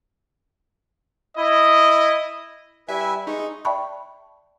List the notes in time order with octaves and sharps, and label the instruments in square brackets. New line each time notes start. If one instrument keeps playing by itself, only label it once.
[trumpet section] E4 D#5
[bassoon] G3 [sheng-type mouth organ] E4 B4 G#5 [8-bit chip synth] E5
[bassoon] G#3 [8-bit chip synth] D#4 [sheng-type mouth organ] C#6
[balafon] D5 E5 G5 A5 B5 C#6